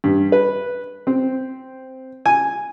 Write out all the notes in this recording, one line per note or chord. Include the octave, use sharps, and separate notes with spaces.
G2
B4
C4
G#5